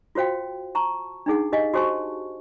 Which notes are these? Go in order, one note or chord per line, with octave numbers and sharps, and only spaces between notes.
F4 F#4 C5 F5 G5
A5 A#5 C#6
D4 D#4 G#4 F#5
G4 D#5 F5 G#5
F#4 G4 C5 G#5 A5 C#6